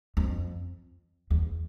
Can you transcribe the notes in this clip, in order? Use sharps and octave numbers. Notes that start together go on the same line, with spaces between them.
F2
E2